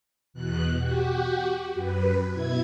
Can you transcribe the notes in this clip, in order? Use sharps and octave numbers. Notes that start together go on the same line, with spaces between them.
E2 B2 F#6
F#4 G4
F#2 B4
B2 E4 G#6